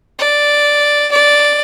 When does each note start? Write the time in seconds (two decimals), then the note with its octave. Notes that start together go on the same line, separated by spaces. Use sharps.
0.19 D5
1.11 D5